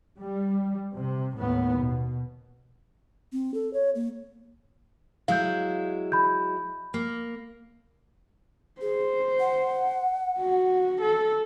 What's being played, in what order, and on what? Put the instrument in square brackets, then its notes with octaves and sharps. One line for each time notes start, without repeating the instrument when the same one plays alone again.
[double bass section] G3
C3
D#2 A2 B3
B2
[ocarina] C4
A4
C#5
A#3
[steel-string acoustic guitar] F#3 G#3 E4 [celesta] F5 G6
[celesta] B5 G6
[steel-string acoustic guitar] A#3
[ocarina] G#4 [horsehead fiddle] C5
[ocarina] F#5
[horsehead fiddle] F#4
A4